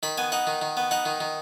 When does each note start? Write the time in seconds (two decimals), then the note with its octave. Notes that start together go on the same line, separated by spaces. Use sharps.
0.03 D#3 B5
0.18 B3 G#5
0.32 D#4 F#5
0.47 D#3
0.62 D#3
0.77 B3
0.91 D#4 F#5
1.06 D#3
1.20 D#3